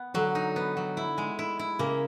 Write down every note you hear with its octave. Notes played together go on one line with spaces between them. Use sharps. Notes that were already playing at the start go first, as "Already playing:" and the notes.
Already playing: B3
D3 F#3
D#4
B3
F#3
E4
G#3
E4
E4
C#3 A#3